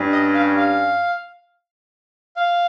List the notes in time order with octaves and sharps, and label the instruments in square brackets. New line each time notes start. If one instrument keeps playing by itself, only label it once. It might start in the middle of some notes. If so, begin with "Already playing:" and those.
Already playing: [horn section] G2 G3 C#4
[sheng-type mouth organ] D#5
F5
F5
F5